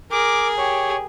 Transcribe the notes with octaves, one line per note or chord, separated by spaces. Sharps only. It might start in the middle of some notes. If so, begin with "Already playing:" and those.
G#4 A#4 D6
G4 C#5